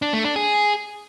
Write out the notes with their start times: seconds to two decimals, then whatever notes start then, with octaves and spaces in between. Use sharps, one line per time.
0.02 D4
0.13 A3
0.24 D4
0.36 G#4